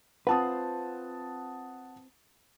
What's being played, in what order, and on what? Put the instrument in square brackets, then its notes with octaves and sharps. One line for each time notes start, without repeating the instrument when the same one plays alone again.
[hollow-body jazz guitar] C4 F4 B4 [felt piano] F#5 A5 D#6